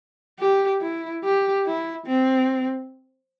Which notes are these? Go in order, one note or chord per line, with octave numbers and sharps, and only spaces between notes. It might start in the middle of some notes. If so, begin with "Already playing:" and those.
G4
E4
G4
E4
C4